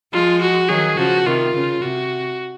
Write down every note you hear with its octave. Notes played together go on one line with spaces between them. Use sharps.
F3 G#3 F4
F#4
D#3 F#3 G#4
C#3 F3 F#4
C3 D#3 F4
C#3
C3 F#4